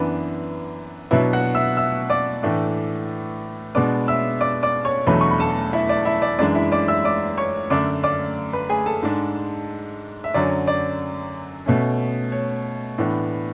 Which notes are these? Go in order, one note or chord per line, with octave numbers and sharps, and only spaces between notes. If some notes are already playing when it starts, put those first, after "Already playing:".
Already playing: F#2 E3 B3 D4 B4
B2 F#3 B3 D4 E4 E5
F#4 F#5
E5 E6
E5 E6
D5 D6
A2 E3 A3 D4
B2 G#3 B3 D4 D5 D6
E5 E6
D5 D6
D5 D6
C#5 C#6
E2 B2 F#3 A3 D4 B4 B5
C#6
B5
A4 A5
E4 E5
D5
E4 E5
D5
F#2 E3 G#3 D4 D5
E4 E5
D5 D6
E5 E6
D5 D6
C#5 C#6
F#2 D3 A3 D4 D5 D6
D5 D6
B4 B5
G#4 G#5
A4 A5
G#2 G#3 D4
E5
F#2 D3 F#3 C#4 D5
D5
B2 A3 C#4
C#5
A2 E3 B3 D4